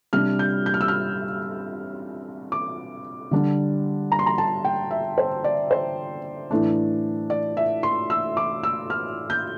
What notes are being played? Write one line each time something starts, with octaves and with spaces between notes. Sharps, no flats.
C3 G3 D4 F6
G6
G6
F6
E6
F6
D6
D3 G3 D4
A#5
C6
A#5
A5
G5
E5
C5
D5
C5
A2 E3 A3 D4
D5
E5
C6
E6
D6
E6
F6
G6